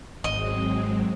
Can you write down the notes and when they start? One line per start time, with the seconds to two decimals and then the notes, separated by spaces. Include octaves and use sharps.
0.24 G#1 F#3 G#3 C4 D#5